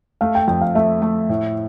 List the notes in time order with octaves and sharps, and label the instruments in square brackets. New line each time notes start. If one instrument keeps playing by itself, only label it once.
[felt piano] A3 [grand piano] F5
[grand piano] G5
[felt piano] F2 [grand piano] G5
[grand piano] F5
[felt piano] A3 [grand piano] E5
[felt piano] A3
A2